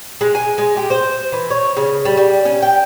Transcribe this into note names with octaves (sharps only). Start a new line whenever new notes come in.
G#3
G#5
G#3
G4
C5
E3
C#5
C#3
G3
G3
C#4
G5